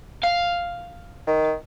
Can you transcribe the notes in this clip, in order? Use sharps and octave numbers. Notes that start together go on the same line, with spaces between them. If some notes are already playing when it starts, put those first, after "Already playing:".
F5
D#3